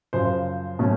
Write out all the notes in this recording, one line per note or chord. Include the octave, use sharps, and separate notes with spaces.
F#2 C#3 F3 C5
B2 F#3 A3 C#4